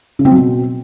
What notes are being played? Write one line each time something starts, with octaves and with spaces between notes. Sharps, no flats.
C#3
C4
F#3
B2